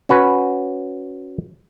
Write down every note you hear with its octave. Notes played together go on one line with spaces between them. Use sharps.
C#4 F#4 B4